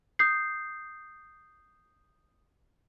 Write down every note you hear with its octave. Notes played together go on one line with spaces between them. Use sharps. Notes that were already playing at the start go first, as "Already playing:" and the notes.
D#6 G6 C7